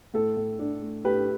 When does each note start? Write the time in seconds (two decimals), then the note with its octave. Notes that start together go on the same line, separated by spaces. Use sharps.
0.14 A2 A4
0.37 A2
0.59 D4
0.82 A3
1.05 A2 G4 B4